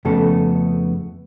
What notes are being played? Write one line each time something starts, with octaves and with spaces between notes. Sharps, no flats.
F2 C#3 A3 B3 A4